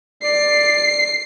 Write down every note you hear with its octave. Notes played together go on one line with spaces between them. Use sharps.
D5 C7